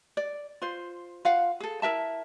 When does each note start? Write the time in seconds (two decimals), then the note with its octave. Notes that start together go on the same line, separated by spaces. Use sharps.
0.17 D5
0.62 F4 C5
1.25 F4 F5 F#5
1.60 G#4 A4
1.82 E4 A#4 E5 A5